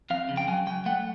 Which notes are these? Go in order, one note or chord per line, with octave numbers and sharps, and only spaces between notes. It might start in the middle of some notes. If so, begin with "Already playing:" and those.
F2 F5
C#3
G5
F#3 G#5
F#3 G5
A3 F#5